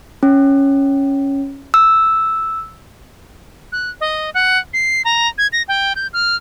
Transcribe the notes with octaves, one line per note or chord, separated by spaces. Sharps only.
C#4
E6
F#6
D#5
F#5
C7
A#5
G#6
A#6
G5
G6
F6